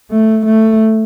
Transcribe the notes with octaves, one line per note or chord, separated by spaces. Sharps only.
A3
A3